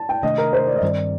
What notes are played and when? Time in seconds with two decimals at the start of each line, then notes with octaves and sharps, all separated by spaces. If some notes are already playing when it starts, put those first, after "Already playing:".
Already playing: A5
0.09 G5
0.23 C3 D#3 A3 D4 D#5
0.38 A#4
0.53 C5
0.67 D5
0.76 D#5
0.82 G2 D#3 G3 C4 D5